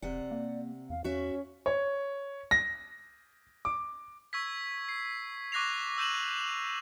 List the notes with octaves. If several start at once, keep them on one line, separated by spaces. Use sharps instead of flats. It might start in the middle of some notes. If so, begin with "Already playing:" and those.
E1 C3 D5 F#5
A#3
E2 F5
E2 C#4 F#4 E5
C#5
A#6
D6
C#6 E6 G#6 B6
C7
C#6 D6 F#6 A#6 C7 F7
E6 G6 D#7 E7 F#7
F7 F#7